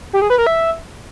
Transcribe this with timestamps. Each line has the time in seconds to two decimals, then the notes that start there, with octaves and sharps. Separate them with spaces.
0.13 G4
0.22 G#4
0.30 B4
0.38 A#4
0.47 E5